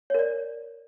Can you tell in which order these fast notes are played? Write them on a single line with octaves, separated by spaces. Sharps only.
C#5 A#4 D5